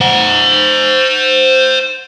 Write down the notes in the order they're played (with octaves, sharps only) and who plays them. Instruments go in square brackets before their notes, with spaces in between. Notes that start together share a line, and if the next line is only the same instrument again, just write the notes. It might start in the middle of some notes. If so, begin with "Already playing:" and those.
[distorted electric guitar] C5 F#5